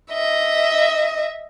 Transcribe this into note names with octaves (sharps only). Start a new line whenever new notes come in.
D#5 E5